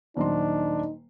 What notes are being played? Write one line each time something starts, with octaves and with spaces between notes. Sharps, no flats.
D#1 F#3 D4 D#4 C6